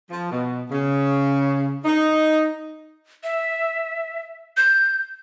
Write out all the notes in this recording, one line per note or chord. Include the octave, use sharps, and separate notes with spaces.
F3
B2
C#3
D#4
E5
G6